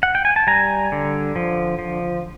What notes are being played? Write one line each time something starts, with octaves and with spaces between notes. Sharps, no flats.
F#5
G5
G#5
A5
G3 G#5 A#5
D3
F3
F3